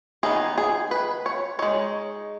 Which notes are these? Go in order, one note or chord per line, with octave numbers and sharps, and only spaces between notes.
D#3 B3 D#4 G#4
G#4
B4
C#5
G#3 D#4 C#5